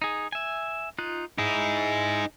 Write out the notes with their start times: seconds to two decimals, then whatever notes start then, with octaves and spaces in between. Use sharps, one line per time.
0.02 D#4 G#4
0.32 E5 G#5
0.98 D#4 F4 F#6
1.38 D#4 E4 G#4